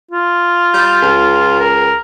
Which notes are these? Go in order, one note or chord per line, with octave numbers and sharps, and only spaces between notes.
F4
G3
C#2
A#4